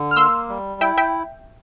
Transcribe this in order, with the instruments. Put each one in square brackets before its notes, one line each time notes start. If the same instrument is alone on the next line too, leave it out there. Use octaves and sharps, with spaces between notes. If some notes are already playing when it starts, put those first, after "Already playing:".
Already playing: [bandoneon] D3
[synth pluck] F6
[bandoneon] A#3 [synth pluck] C6 E6
[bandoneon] G3
[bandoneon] E4 [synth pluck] E5 G5
[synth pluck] E5 G5